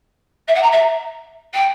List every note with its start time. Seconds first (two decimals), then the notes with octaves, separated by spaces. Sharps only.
0.48 E5
0.54 F#5
0.62 A#5
0.72 E5
1.53 G5